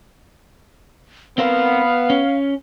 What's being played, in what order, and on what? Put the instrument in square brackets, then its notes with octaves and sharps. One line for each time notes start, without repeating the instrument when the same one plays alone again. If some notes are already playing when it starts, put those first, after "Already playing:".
[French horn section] B3 [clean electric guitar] C4 A#4 C5 [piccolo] F5
[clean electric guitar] C#4